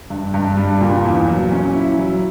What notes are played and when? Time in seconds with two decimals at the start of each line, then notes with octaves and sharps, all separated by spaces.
0.10 G2
0.34 G2
0.57 G3
0.81 A#2
1.05 E2
1.28 F#3
1.52 C#4
1.75 E4
1.99 F#3